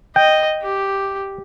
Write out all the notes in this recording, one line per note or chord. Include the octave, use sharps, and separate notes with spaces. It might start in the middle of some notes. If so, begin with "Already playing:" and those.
D#5 G5
G4